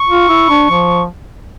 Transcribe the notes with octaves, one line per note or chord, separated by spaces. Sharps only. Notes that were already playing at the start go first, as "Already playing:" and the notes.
Already playing: C#6
F4
E4
D4
F3